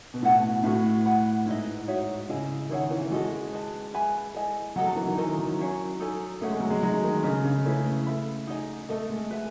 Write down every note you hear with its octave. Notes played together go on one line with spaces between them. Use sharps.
B2
A2 E4 B4 F#5 A5
A2 F#4 B4 E5
B4 F#5 B5
G#2 E4 B4 D#5
D#4 F#4 C#5 E5
C#3 E4 G#4 D#5 G#5
D#3 E4 G#4 C#5 F#5
E3
G#3 F#4 A4 D#5
B4 D#5 A5
B4 E5 G#5 B5
E4 A4 D#5 G#5
F#3 A4 D#5 F#5
F#3
E3
D#3
D#3 D#4 A4 D#5 G#5
F#3
C#4 E4 G#4 C#5
D#4 A4 C#5 G#5
A3 C#4 G#4 C#5 F#5
G#3
F#3
G#3
F#3 D#4 G#4 D#5
D#3
C#3 G#4 B4 D#5
C#3
A3 C#4 E4 G#4 B4
A4 E5 B5
D#4 G#4 D#5 G#5
A3 A4 D#5 A5
G#3
B4 E5 G#5